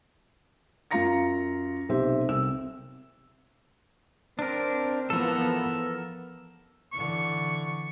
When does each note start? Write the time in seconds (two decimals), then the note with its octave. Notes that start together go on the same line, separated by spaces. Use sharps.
0.91 F#2 F4 F5 A#5 A#6 C#7
1.89 B1 C3 G4 C5 E5
2.29 C2 E6
4.39 C4 D4 A#4
5.10 E3 F3 B3 A4 A#4
6.93 D3 E3 C#6